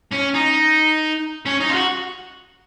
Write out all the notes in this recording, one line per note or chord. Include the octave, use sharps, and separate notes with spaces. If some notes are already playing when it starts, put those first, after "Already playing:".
C#4
D#4
C#4
D#4
F4
F#4